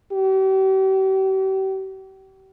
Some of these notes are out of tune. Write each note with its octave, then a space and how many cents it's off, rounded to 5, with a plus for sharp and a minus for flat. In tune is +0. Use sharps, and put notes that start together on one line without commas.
G4 -40